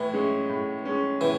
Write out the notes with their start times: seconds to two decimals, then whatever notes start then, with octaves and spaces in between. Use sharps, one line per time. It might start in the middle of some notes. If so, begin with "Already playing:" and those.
Already playing: A2 E3
0.13 G#3 C#4
0.49 A2
0.85 G#3 C#4
1.21 A2 E3